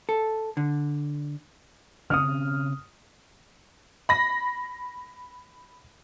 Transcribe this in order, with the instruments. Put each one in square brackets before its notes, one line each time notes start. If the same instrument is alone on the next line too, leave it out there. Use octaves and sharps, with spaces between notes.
[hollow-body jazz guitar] A4
D3
[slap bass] C#3 C4 C#4 [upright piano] D#6 F6
[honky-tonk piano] B5 A#6